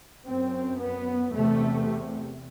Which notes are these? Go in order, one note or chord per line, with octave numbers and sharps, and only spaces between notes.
F#2 C4
B3
E2 C3 A3